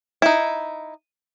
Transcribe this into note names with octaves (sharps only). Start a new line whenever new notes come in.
D#4 E4